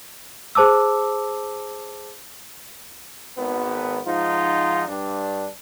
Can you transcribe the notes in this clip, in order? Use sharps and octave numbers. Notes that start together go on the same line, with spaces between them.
G#4 C5 A5 D6 E6
G#1 B3
G#2 F3 D#4 F4
G2 D4